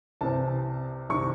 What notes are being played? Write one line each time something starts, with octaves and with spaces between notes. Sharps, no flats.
C2 C3 E3 C4 A5
C2 C3 D#3 C#6